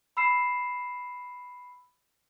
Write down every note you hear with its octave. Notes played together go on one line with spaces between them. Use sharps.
B5 E6 C7 E7